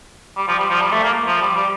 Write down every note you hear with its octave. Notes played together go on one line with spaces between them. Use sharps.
G3
F3
G3
F3
G3
A3
A#3
F3
G3
G3